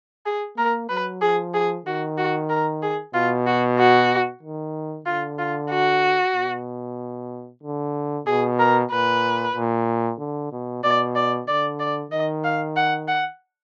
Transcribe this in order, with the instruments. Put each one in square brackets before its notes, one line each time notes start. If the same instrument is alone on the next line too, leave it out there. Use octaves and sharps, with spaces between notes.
[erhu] G#4
[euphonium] A#3 [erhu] A#4
[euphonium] F#3 [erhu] B4
[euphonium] F3 [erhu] G#4
[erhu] G#4
[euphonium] D#3 [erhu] F#4
[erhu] F#4
A#4
G#4
[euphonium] B2 [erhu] F4
[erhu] F#4
F#4
[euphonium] D#3
[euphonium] D3 [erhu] F4
[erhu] F4
F#4
[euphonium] B2
D3
[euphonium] B2 [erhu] G#4
[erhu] A#4
[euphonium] A#2 [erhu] B4
[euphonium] A#2
D3
B2
[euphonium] B2 [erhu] D5
[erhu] D5
[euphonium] D3 [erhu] D5
[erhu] D5
[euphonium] D#3 [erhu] D#5
[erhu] F5
F#5
F#5